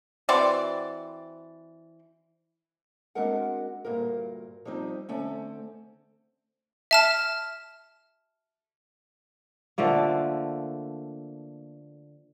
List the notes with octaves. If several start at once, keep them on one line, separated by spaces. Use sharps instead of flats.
E3 C4 F#4 D5
G#3 C4 D4 F#4 A#4 F#5
D2 G2 A#2 A#4
F3 G3 C4 D#4
D3 A3 C4 C#4
E5 A5 F6
D3 F3 A3 A#3